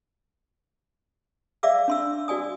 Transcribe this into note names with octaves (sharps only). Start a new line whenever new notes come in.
D5 E5 F5 D6 E6
D4 C6 E6
F#4 D5 G#5 D#6